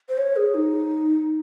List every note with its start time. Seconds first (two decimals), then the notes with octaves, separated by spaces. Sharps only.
0.09 C5
0.18 C#5
0.36 G#4
0.54 D#4